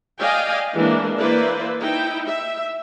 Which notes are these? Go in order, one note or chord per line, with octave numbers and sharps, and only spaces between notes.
D5 D#5 F5 G5 G#5
E3 G#3 A#3 D4
E3 A#3 E4 B4 C5 D5
D#4 E4 G5
E5